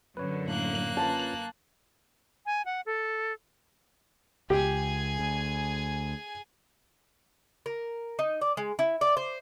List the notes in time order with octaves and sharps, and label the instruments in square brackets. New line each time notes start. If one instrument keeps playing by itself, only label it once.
[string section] F#2 D3 [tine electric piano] B4 C#5
[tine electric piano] A2 [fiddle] A#3 F#6
[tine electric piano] C#4 F4 B4 [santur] A5
[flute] G#5
F#5
A4
[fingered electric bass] C#2 [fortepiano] G4 [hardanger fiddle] G#4 G#5
[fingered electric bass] D2
[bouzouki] A#4
D#4
D5
G#3
E4
D5
C5